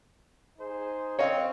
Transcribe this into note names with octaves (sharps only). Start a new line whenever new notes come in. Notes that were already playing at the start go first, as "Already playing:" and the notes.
D#4 G#4 C5
C4 C#5 D#5 F5